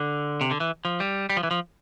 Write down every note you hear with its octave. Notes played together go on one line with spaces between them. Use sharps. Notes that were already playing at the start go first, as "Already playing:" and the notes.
Already playing: D3
C3
D3
E3
F3
G3
G3
F3
E3
F3